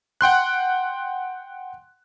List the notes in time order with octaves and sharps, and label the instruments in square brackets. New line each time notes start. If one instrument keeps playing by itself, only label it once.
[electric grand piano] F#5 G5 C6 F#6